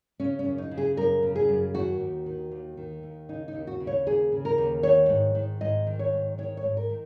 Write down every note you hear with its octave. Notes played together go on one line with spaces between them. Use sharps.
C#3 C#4
C#4
F#2
D#4
C#3
G#4
F#2 A#4
C#3
G#4
F#2
D#3 F#4
D#2
D#3
D#2
D#3
D#2
C#3 D#4
D#4
D#2
F#4
C#3
C#5
D#2 G#4
C#3
A#4
D#2
D#3 C#5
G#2
D#3
G#2 D#5
D#3
C#5
G#2
D#3 C#5
C#5
G#2
A#4
D#3